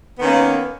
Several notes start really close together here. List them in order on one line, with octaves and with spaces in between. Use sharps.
B3 D#3 C#4 A#3